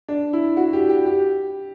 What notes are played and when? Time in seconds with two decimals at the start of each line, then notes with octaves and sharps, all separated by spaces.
0.08 D4
0.33 E4
0.57 F#4
0.73 G4
0.89 G4
1.06 G4